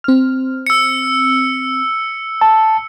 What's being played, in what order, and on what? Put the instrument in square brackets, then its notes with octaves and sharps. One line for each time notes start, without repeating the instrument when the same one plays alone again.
[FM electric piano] C4 F6
[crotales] E6 C#7
[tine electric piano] A5